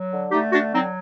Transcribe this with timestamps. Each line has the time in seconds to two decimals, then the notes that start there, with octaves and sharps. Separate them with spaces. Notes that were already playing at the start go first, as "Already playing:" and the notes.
Already playing: F#3
0.11 D3
0.31 A3 D#4 G4
0.52 D3 D4 F#4
0.72 F#3 C4 D#4